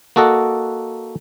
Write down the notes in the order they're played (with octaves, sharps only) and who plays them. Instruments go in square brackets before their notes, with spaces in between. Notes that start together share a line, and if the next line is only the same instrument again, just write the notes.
[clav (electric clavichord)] A#3 F#4 A4 D#5 F#5